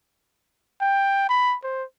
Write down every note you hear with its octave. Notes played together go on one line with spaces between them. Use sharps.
G5
B5
C5